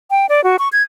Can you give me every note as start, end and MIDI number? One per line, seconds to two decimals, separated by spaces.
0.11 0.26 79
0.29 0.43 74
0.44 0.57 66
0.59 0.69 85
0.72 0.83 92